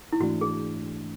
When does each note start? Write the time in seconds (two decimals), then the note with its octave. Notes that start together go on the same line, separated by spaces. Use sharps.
0.13 E4
0.20 G#2 E3 A3 D4 F#4
0.41 G#4